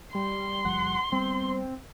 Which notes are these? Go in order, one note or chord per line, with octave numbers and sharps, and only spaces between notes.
G3 C6
F#1 F3 G3 F#5
G3 B3 C4